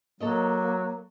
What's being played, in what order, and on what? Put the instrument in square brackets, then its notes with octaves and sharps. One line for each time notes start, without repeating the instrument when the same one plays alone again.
[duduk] F#3 [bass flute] A#3 [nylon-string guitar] A4 C#5 D#5